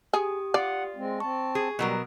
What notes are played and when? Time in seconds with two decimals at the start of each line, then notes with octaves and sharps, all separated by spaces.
0.14 G4 G#4 D#6
0.54 F4 D5 F#5
0.96 G#3 C4
1.20 C4 A5 C#6
1.55 G#4
1.79 B2 F#3 G3 A#4